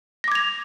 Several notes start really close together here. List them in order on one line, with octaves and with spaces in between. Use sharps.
A#6 D6 G#6 F7